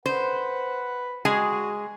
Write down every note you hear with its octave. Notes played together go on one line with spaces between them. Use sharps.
B4 C5 F#5
G#3 F#4 G#4 G#5